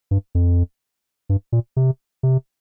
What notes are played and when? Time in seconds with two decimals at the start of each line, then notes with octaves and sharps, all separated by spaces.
0.11 G2
0.35 F2
1.29 G2
1.52 A#2
1.77 C3
2.23 C3